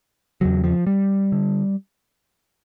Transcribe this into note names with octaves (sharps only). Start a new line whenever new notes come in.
E2 C#3 F#3
F3
G3
D3